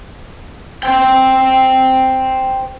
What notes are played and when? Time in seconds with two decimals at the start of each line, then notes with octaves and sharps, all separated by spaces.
0.83 C5 G5